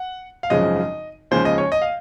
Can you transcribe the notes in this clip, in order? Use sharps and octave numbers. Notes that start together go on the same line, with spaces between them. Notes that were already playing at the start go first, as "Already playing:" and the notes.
Already playing: F#5
F5
G#1 F#2 C#3 F3 G#3 D#5
D#2 C#3 F3 G#3 C5
D#5
C#5
D#5
F5